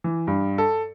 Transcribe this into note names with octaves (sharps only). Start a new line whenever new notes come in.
E3
G2
A4